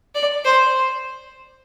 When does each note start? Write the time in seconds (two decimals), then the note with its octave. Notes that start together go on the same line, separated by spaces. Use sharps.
0.15 D5
0.45 C5